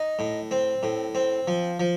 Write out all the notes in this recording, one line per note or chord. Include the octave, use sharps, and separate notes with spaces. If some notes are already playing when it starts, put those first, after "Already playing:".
Already playing: D#4
A2
C4
A2
C4
F3
F3